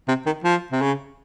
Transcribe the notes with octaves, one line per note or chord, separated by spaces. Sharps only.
C3
D#3
F3
C3
C#3